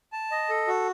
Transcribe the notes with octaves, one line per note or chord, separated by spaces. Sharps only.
A5
D#5
A4
F#4